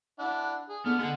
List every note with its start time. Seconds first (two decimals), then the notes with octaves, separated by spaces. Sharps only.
0.19 D4 E4 F#5
0.69 G#4
0.86 D3 B3 F6
0.99 D3 G#3 F#5